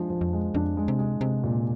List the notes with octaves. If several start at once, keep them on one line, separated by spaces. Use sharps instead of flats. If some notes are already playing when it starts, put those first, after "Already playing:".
Already playing: F3 G#3 D4
F3
F2
G#3
F2 D4
G#3
C3
G#3
C3 G#3
A#2